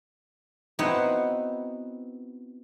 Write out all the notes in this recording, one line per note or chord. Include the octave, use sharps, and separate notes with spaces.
B3 C4 D#4 E4 F#4 F#5